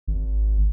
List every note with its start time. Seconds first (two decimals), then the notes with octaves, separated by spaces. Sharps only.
0.08 G#1